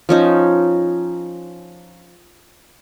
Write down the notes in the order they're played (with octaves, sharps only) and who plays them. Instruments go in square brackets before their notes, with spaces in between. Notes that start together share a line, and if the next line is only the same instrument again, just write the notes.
[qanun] F3 C#4 D#4